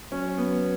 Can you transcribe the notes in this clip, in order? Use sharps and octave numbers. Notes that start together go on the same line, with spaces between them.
F#3 C#4
B3